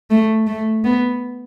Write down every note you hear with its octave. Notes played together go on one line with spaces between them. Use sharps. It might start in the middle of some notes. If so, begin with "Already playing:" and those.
A3
A3
B3